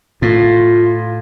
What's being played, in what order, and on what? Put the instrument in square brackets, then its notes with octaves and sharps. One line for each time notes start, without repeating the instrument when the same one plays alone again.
[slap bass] A2 [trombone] F4